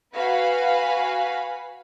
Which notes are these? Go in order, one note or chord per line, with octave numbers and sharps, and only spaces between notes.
F#4 B4 F5 G#5 B5